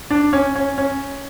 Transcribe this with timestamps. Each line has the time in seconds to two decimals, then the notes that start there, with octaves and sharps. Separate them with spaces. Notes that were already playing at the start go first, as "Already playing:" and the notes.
0.10 D4
0.33 C#4
0.56 C#4
0.78 C#4